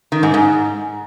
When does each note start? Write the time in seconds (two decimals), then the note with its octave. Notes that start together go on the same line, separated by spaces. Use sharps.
0.12 D#3
0.23 G#2
0.34 G#2